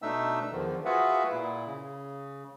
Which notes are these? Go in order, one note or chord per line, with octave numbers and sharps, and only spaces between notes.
B2 A3 D4 D#4 E5 E6
E2 D3 D#3 F3
F4 F#4 G#4 B4 E5 F#5
A#2 E4
C#3